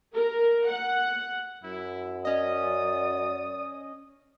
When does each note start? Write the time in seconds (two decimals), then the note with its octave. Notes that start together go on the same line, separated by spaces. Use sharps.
0.14 A#4
0.69 F#5
1.64 F#2 E4
2.25 C#4 D5 D#5 D#6